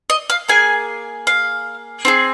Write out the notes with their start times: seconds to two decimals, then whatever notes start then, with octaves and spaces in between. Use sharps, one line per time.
0.10 D#5
0.30 F5
0.48 A#3 G#4 G#5
1.27 F5
2.05 C4 F4 G#4